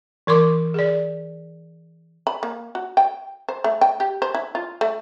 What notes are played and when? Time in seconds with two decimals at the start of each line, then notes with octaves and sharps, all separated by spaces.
0.27 E3 A#4 C6 D6
0.74 G#4 D5
2.27 B5
2.43 A#3
2.75 F#4
2.97 G5
3.49 C5
3.64 A3
3.81 G5
4.00 G4
4.22 C5
4.34 E4
4.55 F4
4.81 A3